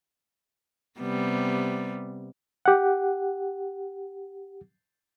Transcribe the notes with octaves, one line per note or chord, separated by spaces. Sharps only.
C3 G3 B3
G4 F#5